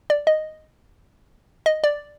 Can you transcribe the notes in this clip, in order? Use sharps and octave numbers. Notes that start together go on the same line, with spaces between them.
D5
D#5
D#5
D5